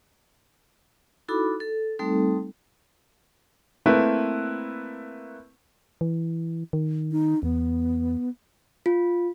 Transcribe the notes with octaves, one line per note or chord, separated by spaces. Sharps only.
D#4 E4 F#4 A4 B5 D6
A4
G3 A3 C4 D#4 A4
A3 A#3 C4 E4 A#4 B4
E3
D#3
D#4
E2 B3
F4